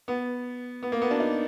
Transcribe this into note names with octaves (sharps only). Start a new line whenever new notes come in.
B3
B3
A#3
B3
D4
D#4